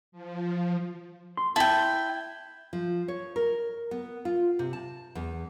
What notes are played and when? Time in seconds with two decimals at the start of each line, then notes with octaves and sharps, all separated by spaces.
0.12 F3
1.37 C6
1.56 E4 G5 A5
2.73 F3
3.08 C#5
3.36 A#4
3.91 B3
4.25 F4
4.59 C3
4.73 A5
5.15 E2